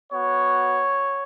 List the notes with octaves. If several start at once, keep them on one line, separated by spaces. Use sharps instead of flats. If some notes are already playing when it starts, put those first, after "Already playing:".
B3 F#4 C#5